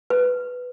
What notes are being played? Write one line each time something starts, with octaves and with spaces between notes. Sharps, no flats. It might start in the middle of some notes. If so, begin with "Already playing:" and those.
B4